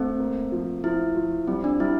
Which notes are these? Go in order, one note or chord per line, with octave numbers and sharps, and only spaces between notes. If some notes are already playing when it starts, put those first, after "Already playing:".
Already playing: A3 C4
A#3
F3
F3 E4
F3
G3 C4
D4
G3 E4